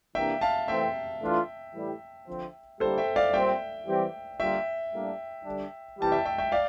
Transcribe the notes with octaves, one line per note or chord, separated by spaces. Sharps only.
C3 E3 A#3 D4 G4 E5 G5
F5 A5
E3 A3 C4 E5 G5
E3 A3 D4 F4
A2 E3 G3
D3 F3 C4
D3 G3 A#3 E4 G4 A4 C5
E5 G5
D5 F5
A#2 G3 C4 E5 G5
E3 G3 C4 G4
D3 G3 A#3 F4 E5 G5
A2 G3 A#3 D4 G4
D3 G3 D4
C3 E3 G3 A5
E5 G5
E5 G5
E5 G5
D5 F5